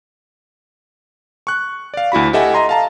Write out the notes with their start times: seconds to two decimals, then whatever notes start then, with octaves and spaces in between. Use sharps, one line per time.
1.47 C#6 F#6
1.94 D5 F5
2.12 D2 E4 F#4 B5
2.33 G4 A4 D#5 E5 F#5 G#5
2.54 D#5 A#5 C6
2.69 F5 A5 A#5